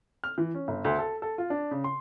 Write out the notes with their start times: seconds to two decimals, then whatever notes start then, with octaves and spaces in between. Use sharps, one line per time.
0.24 F6
0.38 E3
0.55 C#4
0.68 G1
0.85 D2
0.99 A4
1.22 A4
1.38 F4
1.50 D4
1.71 C#3
1.84 C6